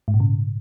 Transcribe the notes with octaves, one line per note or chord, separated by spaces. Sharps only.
G#2
A#2
C#3